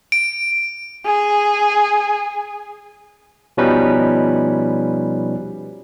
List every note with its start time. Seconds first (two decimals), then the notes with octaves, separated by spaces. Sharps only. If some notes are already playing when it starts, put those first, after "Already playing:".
0.12 D7
1.05 G#4
3.57 B2 F3 G3 C#4 D#4 B4